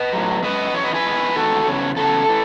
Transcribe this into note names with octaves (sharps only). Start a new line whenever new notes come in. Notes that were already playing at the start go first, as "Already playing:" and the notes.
Already playing: B4 D#5
A2 F#3
F#2 E3 G#3 B4 D#5
F#2 E3 C#5
B4 D#5
G#4 B4
E2 D#3 G#3
E2 D#3 G#3 F#4 A4
E2 C#3 F#3
E2 C#3 F#3 A4
E3